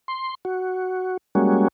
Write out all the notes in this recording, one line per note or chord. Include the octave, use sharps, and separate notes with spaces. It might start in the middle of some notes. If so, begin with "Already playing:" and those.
C6
F#4
G3 G#3 A#3 C#4 F#4